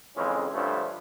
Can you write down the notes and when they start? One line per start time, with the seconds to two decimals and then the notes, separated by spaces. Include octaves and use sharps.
0.15 F2 C#3 E3 G#3 C4 C#4
0.53 G2 D3 F3 A3 C#4